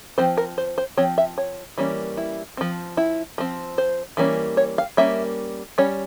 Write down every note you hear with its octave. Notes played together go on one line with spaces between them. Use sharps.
F3 C4 C5
A#4
C5
C5
F3 C4 C#5
E5
C#5
E3 G3 A#3 C#4
E4
F3 C4
E4
F3 C4
C5
E3 G3 A#3 C#4
C#5
F5
G3 A#3 C#4 E5
G3 C#4 C#5